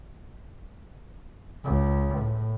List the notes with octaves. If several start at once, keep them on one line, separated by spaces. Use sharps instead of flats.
C#2
A2